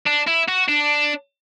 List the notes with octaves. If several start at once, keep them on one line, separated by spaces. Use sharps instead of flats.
D4
E4
F#4
D4